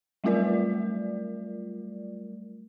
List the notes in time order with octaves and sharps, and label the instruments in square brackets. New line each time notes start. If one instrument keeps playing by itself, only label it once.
[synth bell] F#3 G3 A3 F4 A#4 D5